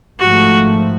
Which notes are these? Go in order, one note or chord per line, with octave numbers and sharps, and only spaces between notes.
G#1 G#2 F3 A3 F#4